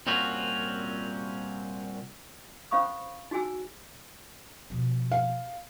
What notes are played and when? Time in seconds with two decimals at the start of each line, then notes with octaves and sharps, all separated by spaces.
0.07 C2 A#2 C4 C#4 F4 F#4
2.71 C#4 C5 F5 B5 C#6 D#6
3.31 D#4 F#4 G#4 G#5 E6
4.70 B2 F3
5.12 F5